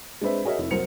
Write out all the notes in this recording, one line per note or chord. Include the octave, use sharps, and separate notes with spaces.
G#3 C4 D4 B4 C5 E5
F#4 G#4 A#4 C#5 D#5 E5
F1 E4
C2 F#3 A#4 C5 C#7 F7